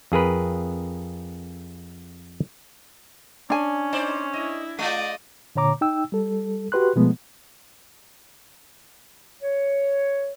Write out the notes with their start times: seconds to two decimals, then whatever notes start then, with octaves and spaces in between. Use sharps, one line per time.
0.12 F2 G#4 A#4 B4
3.50 C#4 D4 G#5
3.93 D#4 C5 D5
4.34 E4 D#5
4.79 G#3 F4 D5 D#5
5.56 A#2 D3 C#5 A#5 D6
5.81 D#4 G5 E6
6.12 G3 A4
6.72 F#4 G4 B4 C6 F#6
6.96 B2 F3 G#3 A3 B3
9.41 C#5